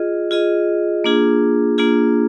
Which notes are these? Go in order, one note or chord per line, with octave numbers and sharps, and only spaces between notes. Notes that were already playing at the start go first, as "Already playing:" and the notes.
Already playing: F4 G#4 D#5
F4 G#4 D#5
A#3 D4 F4 G#4
A#3 D4 F4 G#4